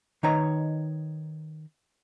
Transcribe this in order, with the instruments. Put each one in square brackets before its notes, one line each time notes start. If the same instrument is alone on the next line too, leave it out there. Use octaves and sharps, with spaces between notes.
[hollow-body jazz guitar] D#3 D#4 B4 C#5 A#5